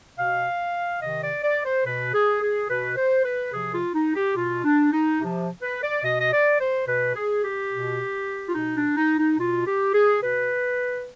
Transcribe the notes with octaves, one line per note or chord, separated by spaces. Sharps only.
B2 F5
C3 D#3 D#5
D5
D5
C5
B2 B4
G#4
G#4
B2 B4
C5
B4
C3 F3 G#4
F4
D#4
G4
B2 F4
D4
D#4
C3 F3
B4
D5
B2 D#5
D#5
D5
C5
B2 B4
G#4
G4
B2
F4
B2 D#4
D4
D#4
D#4
B2 F4
G4
G#4
B2 B4